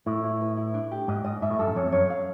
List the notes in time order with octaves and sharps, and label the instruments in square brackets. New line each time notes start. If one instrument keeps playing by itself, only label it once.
[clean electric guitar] A2 [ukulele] E4
[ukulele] E4
B4
E4
D4
G4
[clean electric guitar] G#2 [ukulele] D#5
[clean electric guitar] G#2 [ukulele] D#5
[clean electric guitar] G#2 [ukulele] E5
[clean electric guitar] A2
[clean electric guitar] G2 [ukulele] A4
[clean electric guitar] F#2
[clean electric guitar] F2 [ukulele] C#5
[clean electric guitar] F#2 [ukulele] C#5
[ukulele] F5